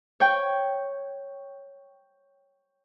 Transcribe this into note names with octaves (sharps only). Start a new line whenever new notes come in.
C#5 G5